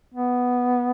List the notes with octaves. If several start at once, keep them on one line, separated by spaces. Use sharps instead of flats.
B3